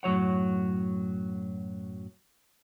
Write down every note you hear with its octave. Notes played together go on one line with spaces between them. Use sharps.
F#2 A2 F#3 C#5 F#5